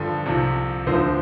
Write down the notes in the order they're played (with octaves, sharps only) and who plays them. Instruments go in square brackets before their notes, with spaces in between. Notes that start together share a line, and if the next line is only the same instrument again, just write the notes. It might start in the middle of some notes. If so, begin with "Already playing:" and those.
Already playing: [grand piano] G2 D3 F3 A4
C2 C3 F3
D2 D3 F3 C5